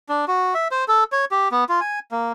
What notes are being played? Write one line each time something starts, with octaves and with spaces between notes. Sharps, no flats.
D4
F#4
E5
C5
A4
C#5
G4
B3
F4
G#5
A#3